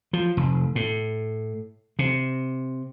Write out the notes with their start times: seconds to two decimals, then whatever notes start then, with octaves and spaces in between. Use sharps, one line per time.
0.13 F3
0.37 F1
0.75 A2
1.99 C3